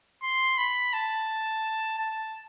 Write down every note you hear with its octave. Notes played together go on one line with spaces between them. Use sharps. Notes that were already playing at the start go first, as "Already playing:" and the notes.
C6
B5
A5
A5